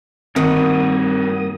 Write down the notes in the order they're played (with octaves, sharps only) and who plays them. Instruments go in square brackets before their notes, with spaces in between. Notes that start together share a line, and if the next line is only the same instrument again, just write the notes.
[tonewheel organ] G2 A#3 D#6 [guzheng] D#3 [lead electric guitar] G3 F#4 [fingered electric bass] C4